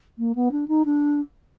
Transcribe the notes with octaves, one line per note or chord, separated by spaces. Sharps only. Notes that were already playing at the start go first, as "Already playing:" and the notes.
A#3
B3
D4
D#4
D4